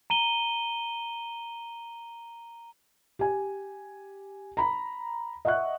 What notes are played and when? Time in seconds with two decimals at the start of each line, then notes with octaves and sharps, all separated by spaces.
0.10 A#5 D#7 G7
3.19 G4 G#5
4.57 A#5 B5
5.45 D#5 E5 F#5 C#6 F#6